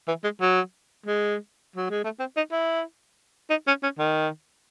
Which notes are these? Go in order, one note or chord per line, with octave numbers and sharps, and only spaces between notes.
E3
G#3
F#3
G#3
F#3
G#3
A3
C4
D#4
E4
D#4
C#4
C#4
D#3